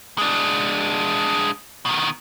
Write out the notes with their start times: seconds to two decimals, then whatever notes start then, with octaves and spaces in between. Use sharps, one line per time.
0.18 G#3 D4
1.86 B2 D#3